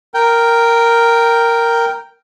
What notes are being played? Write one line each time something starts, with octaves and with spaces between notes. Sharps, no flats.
A#4 G5